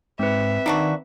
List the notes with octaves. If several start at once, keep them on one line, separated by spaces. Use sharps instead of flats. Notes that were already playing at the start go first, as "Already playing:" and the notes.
G#2 C4 B4 E5
D#3 A#3 D4 F#4